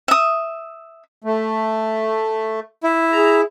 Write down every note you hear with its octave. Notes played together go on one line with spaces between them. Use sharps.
E5 D#6
A3
E4
G#4 A#5